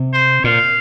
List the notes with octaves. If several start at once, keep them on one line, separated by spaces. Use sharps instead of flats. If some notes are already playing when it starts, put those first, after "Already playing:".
Already playing: C3
C5
A#2 F5